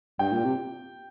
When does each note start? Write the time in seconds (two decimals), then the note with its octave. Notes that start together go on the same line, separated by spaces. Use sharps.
0.19 G2 G5
0.32 A#2
0.45 C3